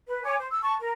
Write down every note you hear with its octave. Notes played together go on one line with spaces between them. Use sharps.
B4
C#5 G#5 D6
C5
E6
A5 C#6
A#4